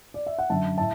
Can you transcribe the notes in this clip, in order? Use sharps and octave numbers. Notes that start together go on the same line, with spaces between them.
D5
E5
F#5
F#2 D3 F#3 E5 A5
A2 E5 A5